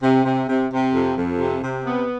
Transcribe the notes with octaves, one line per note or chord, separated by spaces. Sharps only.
C3
C3
C3
C3
F2
F2
C3
C3
B3